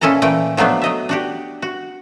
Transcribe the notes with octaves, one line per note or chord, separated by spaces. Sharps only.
A#2 C#4 E4 A4 D#5 A#5
A#2 E3 A3 G5
F3 F#3 A3 B3 D4
F#3 D#5 E5
D4 F#4 G4
F#4